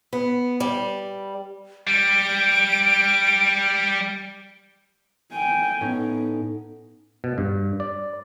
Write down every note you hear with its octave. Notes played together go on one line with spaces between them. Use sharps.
B3
G3
G3 D7
G5 G#5 D7
A2 B3 C#4 D#4
B2
G2
D5